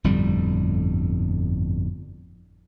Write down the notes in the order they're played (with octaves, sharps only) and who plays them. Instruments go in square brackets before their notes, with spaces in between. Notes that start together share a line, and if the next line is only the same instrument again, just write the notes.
[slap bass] G1 F2 A2 G3